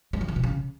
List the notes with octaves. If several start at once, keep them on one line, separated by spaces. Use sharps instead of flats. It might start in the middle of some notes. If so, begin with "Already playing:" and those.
G#3
D#3
D3
B2
C#3